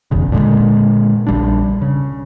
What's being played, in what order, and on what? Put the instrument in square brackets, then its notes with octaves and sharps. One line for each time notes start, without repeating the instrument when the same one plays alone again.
[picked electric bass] F#1 B1 E2 C#3
A#2 D3 G#3
A#1 G3 D4
C#3